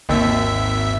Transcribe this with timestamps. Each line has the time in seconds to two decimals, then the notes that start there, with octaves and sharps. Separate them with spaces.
0.09 G#1 D#2 E5